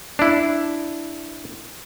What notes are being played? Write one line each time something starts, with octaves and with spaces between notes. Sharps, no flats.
D4 E4